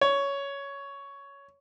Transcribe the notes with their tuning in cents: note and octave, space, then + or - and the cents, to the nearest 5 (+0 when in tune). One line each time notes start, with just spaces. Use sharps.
C#5 +10